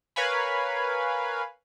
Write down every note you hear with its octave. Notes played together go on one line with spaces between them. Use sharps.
A#4 B4 C#5 F5 G#5 B5